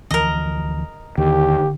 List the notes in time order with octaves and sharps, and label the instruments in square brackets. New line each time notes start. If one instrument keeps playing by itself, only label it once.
[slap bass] D2 E3 F3 [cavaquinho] A#4 D#5
[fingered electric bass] D#2 [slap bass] D3 [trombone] G4